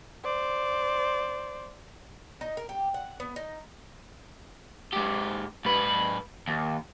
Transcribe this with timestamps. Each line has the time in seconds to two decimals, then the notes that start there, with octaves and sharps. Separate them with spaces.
0.25 C5 D5
2.41 D#4
2.57 A#4
2.69 G4
2.94 F#5
3.20 B3
3.36 D#4
4.93 G#2 G4
5.65 G#2 B4
6.47 D#2